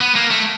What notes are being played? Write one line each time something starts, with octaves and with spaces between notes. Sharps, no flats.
B3
A#3
A3